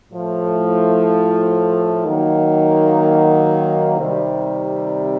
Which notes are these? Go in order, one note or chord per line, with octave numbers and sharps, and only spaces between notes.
A2 F3 A3
D#3 F#3 A#3
C3 D#3 G3